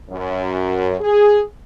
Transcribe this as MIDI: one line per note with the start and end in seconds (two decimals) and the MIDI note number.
0.10 0.96 42
1.01 1.41 68